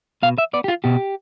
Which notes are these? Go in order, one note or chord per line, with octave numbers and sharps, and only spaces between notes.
B2 F5
E5
B3 D5
G4
F4
B2 G4